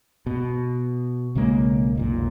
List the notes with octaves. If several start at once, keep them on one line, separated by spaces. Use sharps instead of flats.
B2
B1 C#3 G#3 A#3
F1 B1 A#2